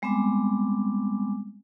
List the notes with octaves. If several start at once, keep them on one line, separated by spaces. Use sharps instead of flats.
G3 G#3 B3 C4 G#5 D6